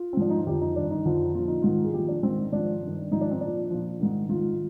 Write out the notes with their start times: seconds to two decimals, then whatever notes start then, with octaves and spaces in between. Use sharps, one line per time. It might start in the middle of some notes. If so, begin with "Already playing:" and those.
Already playing: F4
0.13 C4
0.17 G#2 F3 D4
0.30 D#4
0.38 F4
0.47 F2 D3 F3 G4
0.61 D#4
0.76 G2 D#3 D4
0.91 D#4
1.05 F2 D3 F3
1.35 A#2 F3 F4
1.48 D#4
1.62 G#2 D#3 F4
1.84 G#4
1.93 A#2 F3 G4
2.08 D4
2.23 G#2 D#3 C4
2.52 G#2 F3 D4
2.82 G2 D#3
3.11 G#2 F3 D#4
3.21 D4
3.31 C4
3.41 A#2 F3 D4
3.70 A#2 F3
4.00 G#2 D#3
4.29 G#2 D#3 F4